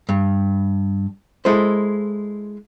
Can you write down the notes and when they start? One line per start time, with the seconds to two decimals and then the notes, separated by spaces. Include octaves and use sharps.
0.09 G2
1.45 G#3 E4 A4 C5